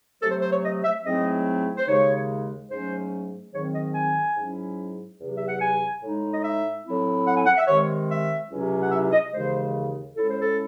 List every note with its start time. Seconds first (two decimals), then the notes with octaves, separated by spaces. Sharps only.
0.21 C3 F#3 A3 A4
0.31 C5
0.42 C5
0.52 C#5
0.63 D#5
0.83 E5
1.04 G#2 F#3 A3 C4 E4 D#5
1.76 C5
1.87 D#2 C#3 G#3 D#4 C#5
2.69 G#2 F#3 A3 C#4 C5
3.52 G#2 D#3 F#3 C4 C#5
3.73 D#5
3.94 G#5
4.35 G#2 F#3 C#4 E4
5.18 E2 C3 F#3
5.36 E5
5.48 F#5
5.60 G#5
6.01 A2 G#3 D#4
6.32 D#5
6.42 E5
6.84 A2 F#3 C4 E4
7.25 F#5
7.35 G#5
7.46 F#5
7.57 E5
7.66 C3 D#3 G#3 C#5
8.08 E5
8.49 C#2 C3 F#3 C#4 E4
8.82 F#5
8.91 E5
9.12 D#5
9.32 D#2 C#3 E3 G#3 C5
10.15 A2 G#3 C#4 E4 A4
10.28 C5
10.40 A4